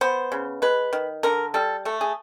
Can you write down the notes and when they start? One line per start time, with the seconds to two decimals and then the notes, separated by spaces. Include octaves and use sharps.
0.01 B3 C5
0.32 C#3
0.62 G#3 B4
0.93 D#3
1.23 D3 A#4
1.54 G3 A4
1.85 A3 A4
2.01 G#4